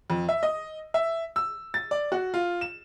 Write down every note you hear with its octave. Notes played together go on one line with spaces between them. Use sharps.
F2
E5
D#5
E5
E6
A6
D5
F#4
F4
E7